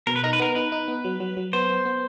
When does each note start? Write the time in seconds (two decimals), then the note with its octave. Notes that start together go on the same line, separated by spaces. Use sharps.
0.07 B2 A#4
0.16 B4
0.24 D#4 A#4
0.33 B4
0.40 B3 A#4
0.55 D#4 B4
0.72 D#4
0.88 B3
1.05 F#3
1.20 F#3
1.37 F#3
1.53 B3 C5
1.70 B3
1.85 B3